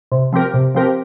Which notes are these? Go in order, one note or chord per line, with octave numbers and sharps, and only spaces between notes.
C3
F3 C4 G4 A#4
C3
F3 C4 G4 A#4